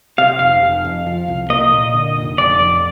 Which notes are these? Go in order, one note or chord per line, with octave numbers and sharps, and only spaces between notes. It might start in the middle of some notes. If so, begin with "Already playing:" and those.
C3 F5
F1 F5
F1
F2
F3
C2
A#3 D#5
A#2
D3
F1
F1 D5
F2